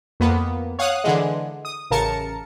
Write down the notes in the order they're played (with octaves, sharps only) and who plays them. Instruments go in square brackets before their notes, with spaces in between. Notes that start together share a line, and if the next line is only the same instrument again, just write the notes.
[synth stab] F2 A#3 B3
C#5 F5 F#5 D#6 F#6
D3 E3 G#3
D#6
A1 C#3 A#4 A5 C#7